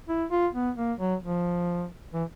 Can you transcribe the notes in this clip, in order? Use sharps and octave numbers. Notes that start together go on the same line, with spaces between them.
E4
F4
B3
A#3
F#3
F3
E3